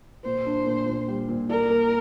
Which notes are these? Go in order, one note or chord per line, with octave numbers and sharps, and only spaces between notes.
A#2 C5
D4
A#2
A#2
G3
A#2
A#4 D5
A#3